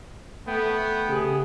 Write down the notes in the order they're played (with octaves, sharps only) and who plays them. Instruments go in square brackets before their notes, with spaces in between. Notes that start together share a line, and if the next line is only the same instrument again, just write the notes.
[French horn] A3 [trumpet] B3 [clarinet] G5
[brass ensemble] C#3 G4 G#4